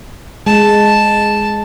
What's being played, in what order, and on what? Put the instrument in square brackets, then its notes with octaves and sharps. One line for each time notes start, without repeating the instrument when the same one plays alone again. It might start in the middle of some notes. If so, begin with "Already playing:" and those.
[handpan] G#3 [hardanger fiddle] A5